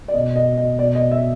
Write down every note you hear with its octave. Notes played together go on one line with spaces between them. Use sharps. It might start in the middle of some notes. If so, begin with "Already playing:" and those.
D5
B2 D#5
D#5
D#5
B2 D5
D#5
E5